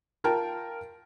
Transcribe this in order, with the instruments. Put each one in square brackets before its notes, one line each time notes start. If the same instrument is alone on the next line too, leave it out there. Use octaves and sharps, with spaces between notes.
[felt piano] F4 A#4 G5 A5